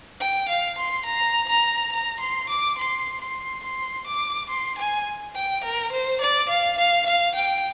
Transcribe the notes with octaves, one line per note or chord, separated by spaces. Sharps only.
G5
F5
C6
A#5
A#5
A#5
C6
D6
C6
C6
C6
D6
C6
G#5
G5
A#4
C5
D5
F5
F5
F5
G5